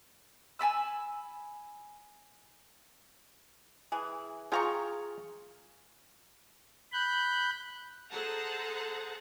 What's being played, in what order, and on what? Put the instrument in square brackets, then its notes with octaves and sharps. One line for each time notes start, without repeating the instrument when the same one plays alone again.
[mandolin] G#5 A5 B5 E6
[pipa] E3 G#4
[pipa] A3 A#5 C#6 [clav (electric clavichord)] F4 G#4 G5
[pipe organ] B5 F#6 G6
[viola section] G#4 A4 C5 F#5 A5 A#5